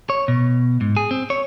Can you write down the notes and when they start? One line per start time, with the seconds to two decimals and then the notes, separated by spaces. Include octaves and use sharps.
0.10 C#5
0.28 B2
0.81 G#2
0.97 G#4
1.11 C4
1.30 C#5